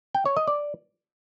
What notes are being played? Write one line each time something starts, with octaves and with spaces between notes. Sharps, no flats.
G5
C#5
D#5
D5